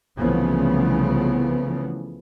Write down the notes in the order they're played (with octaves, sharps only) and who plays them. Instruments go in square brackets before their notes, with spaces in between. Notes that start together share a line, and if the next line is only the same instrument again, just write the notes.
[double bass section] C2 C#3 E3 F3 A3 B3